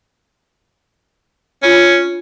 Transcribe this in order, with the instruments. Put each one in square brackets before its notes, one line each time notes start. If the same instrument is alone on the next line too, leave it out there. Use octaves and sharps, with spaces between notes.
[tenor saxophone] C#4 [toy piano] D4 F4 B5